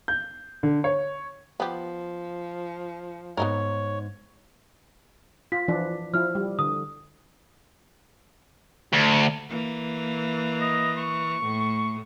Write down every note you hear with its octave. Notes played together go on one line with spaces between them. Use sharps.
G6
D3
C#5
F3 B3 G4
G#2 B3 D#4 A#4 C#5
F4 B6
E3 F3 D4
F3 E4 F6
G3
D3 D#6
D2
E3 A#3
D#5
C#6
A2